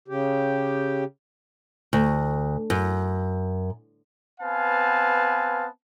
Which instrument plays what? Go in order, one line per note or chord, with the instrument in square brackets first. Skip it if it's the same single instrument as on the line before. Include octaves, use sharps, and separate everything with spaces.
[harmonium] C#3 G4
[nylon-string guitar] D2
F#2
[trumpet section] B3 C4 B4 F5 G#5 A5